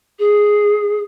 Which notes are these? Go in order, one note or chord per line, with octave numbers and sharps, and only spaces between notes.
G#4